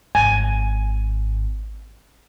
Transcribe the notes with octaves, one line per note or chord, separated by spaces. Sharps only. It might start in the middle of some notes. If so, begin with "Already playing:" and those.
G#1 G#5